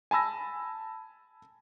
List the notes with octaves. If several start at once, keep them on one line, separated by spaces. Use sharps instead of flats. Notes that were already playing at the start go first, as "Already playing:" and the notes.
G#5 A5 B5 E6 A#6